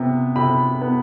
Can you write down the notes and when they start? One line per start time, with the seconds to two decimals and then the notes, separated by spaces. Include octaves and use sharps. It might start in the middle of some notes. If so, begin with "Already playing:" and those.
Already playing: C3 B3
0.36 C3 B5
0.81 B3